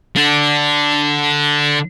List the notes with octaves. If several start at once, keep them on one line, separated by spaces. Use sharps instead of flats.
D3 D4